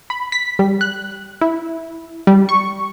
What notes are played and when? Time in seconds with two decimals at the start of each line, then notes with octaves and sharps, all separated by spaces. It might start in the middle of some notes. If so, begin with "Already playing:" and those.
0.10 B5
0.32 B6
0.59 G3
0.81 F#6
1.41 E4
2.27 G3
2.49 C#6